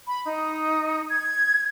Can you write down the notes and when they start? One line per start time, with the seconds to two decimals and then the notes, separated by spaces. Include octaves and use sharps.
0.07 B5
0.25 D#4
1.10 G#6